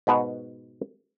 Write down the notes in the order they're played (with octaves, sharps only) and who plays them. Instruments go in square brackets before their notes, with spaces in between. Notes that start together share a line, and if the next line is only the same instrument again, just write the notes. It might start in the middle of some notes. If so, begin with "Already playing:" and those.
[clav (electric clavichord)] G#2 B2 B3 F#4 F#5